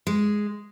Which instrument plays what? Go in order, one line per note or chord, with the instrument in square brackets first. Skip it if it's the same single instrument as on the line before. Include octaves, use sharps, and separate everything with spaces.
[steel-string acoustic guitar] G#3